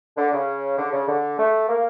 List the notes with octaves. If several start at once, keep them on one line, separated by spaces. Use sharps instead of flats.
D3
C#3
D3
C#3
D3
A3
A#3